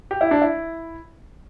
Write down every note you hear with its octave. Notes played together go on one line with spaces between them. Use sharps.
G4
E4
D4
E4